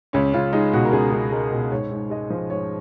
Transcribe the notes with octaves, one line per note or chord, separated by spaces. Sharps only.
C#2 C#4
C#2 F4
G#3 D#4
B2 F#4
A#4
C#2 G#4
C#2
G#3 A#4
B2
G#2 C#5
G#2
G#3 D#5
F3
G#2 C#5